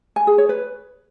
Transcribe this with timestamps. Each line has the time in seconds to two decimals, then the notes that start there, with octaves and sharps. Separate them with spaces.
0.16 G#5
0.27 G#4
0.38 C#5
0.49 B4